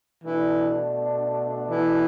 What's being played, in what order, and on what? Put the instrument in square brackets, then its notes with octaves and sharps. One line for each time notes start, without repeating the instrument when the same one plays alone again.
[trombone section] B2 A3 D4 [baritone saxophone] E3
[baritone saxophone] E3